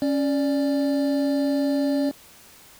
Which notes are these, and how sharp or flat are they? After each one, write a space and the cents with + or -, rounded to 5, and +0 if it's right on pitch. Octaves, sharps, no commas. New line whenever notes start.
C#4 +0 D5 +0